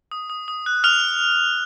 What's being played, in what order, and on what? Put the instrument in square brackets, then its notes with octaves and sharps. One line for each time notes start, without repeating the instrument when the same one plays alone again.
[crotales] D#6
D#6
D#6
F#6
D#6 F6 F7